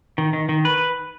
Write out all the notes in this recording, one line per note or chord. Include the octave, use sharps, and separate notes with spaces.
D#3
D#3
D#3
B4